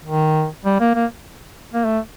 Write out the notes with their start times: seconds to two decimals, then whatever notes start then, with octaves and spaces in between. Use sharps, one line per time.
0.05 D#3
0.65 G3
0.80 A#3
0.95 A#3
1.74 A#3
1.85 A3